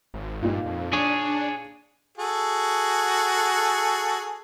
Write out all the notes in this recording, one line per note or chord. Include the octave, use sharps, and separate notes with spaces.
G#1
G2 A#2 D#4 F4
F2
D4 G#4 C#5
F#4 G#4 A4